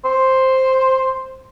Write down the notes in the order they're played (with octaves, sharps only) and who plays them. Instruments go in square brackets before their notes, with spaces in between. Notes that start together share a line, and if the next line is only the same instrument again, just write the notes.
[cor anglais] C5